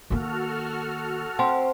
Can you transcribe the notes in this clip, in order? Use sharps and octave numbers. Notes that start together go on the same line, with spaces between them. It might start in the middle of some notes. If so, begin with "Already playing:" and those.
D#3 A#3 F#4 A4 F6
C4 F#5 A5 C6